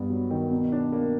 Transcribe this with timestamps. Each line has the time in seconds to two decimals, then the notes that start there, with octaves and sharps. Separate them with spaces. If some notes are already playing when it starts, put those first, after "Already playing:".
Already playing: G2 B3
0.10 F#3
0.30 D#3
0.51 B2
0.72 D4
0.92 A#3